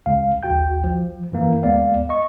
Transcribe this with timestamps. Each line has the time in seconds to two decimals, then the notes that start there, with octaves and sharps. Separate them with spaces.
0.06 C#2 F5
0.43 A#1 D#2 F#4 G5 G6
0.84 F3
1.32 F#2 E3 A#3
1.63 D2 G#3 B3 D5 F5
2.09 D#5 C#6